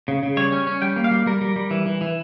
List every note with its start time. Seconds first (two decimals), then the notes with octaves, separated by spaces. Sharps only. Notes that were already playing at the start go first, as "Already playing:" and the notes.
0.08 C#3
0.23 C#3
0.37 G3 C#5
0.52 C#4
0.67 C#4
0.82 G3 G5
0.96 A#3
1.04 F5
1.11 G3
1.27 G3 A#4
1.41 G3
1.56 G3
1.71 E3
1.86 E3
2.01 E3